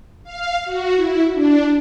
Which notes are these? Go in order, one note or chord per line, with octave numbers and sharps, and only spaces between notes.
F5
F#4
E4
D4